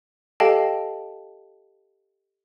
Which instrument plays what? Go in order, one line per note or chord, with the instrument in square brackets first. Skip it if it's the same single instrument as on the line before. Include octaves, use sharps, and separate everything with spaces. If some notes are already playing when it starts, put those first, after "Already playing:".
[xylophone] G4 A4 D#5 F5 G5 A5